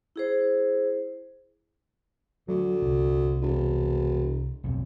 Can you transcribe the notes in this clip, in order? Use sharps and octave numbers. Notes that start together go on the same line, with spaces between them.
E4 G#4 C5
D2 F#3
C2
E1
B1 F2